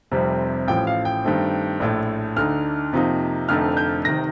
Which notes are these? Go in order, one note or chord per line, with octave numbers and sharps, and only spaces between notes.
F1 F2 C3 G3 C4
A1 A2 F3 G5
F5
G5
G2 D#3 A3 C4
A#1 A2 A3
D2 D3 A3 D#4 F6
F2 C3 F3 A#3 D#4
F1 F2 D3 A3 D#4 F6
G6
F1 C3 D#3 A#6